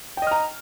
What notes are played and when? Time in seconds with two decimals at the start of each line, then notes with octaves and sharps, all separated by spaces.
0.17 G5
0.22 D#5
0.27 F6
0.31 A#5